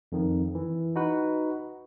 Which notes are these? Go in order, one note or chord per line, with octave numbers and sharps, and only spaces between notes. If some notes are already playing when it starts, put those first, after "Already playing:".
F2 D#3
E3
D#4 F#4 B4